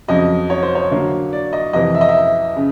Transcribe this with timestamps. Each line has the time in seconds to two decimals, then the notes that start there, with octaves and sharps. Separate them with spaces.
0.08 F2 C#3 F#3 D#5
0.50 C#5
0.63 C5
0.75 C#5
0.91 D3 F#3 A#3
1.33 D5
1.53 D#5
1.73 F2 C3 E3 D#5
1.95 E5
2.01 D#5
2.09 E5
2.56 C#3